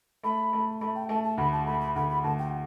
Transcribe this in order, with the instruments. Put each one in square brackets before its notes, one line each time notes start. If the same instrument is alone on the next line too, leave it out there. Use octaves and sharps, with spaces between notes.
[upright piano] A3 [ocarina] B5
[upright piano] A3
[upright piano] A3 [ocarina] B5
[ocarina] G5
[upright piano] A3 [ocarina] A5
[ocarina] A5
[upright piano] D2 [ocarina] B5
[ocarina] A5
[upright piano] A3 [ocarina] B5
[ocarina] B5
[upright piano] D2 [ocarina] B5
[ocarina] B5
[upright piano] D2 [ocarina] A5
[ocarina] G5